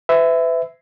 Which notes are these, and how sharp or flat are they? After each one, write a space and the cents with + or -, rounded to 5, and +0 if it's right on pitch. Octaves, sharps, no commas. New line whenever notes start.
B4 +40 E5 +0